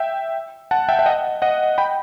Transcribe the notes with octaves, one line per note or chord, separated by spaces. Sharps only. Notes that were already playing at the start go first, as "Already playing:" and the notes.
Already playing: E5 G5
F#5 A5
E5 G5
E5
D#5 F#5
D#5 F#5
G5 B5